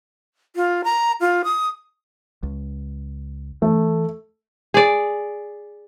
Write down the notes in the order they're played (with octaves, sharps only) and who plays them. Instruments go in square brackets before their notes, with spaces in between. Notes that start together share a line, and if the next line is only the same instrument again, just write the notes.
[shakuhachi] F4
A#5
F4
D#6
[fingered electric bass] C#2
[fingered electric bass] E3 [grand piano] A3
[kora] G#4 D5